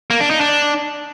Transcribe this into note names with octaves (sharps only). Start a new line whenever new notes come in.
A#3
D4
D#4
D4